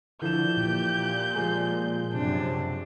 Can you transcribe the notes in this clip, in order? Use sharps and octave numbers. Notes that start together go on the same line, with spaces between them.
D3 E3 F3 G6 E7
A#2 G4
F3 G#3 G#5
F#2 C3 D4